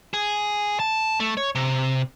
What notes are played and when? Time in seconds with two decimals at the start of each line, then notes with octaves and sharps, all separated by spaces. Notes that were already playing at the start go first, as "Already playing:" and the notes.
0.14 G#4
0.80 A5
1.20 A3
1.37 C#5
1.55 C3